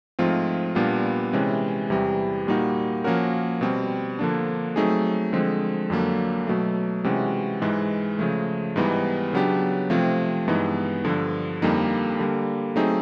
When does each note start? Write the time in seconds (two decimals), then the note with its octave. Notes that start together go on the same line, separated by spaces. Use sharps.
0.19 G#2 F3 A3 C4 F4
0.75 A#2 G3 B3 D4 F4
1.33 C3 E3 G#3 C#4
1.90 E2 C3 E3 G3
2.47 A#2 G3 A#3 D#4 F#4
3.04 F3 A#3 C#4 F#4 A#4
3.61 B2 G3 C4
4.19 D3 F3 A#3 D4
4.76 F#3 A3 C4 D#4 G#4
5.33 D3 F3 G#3 C4
5.90 F2 D3 F#3 A#3
6.47 B2 F#3 A3
7.04 C3 E3 G#3 C#4 F#4
7.62 G#2 E3 G#3
8.19 C#3 F3 A3
8.76 G#2 E3 G3 B3 D#4
9.33 C#3 F#3 B3 D4 G4
9.90 C3 F3 A3 C4 F4
10.48 G2 E3 G#3 B3 D#4
11.05 G2 D3 F3
11.62 F2 D3 G3 A#3 D#4
12.19 D3 G3 A#3
12.76 F#3 A3 C4 D#4 G#4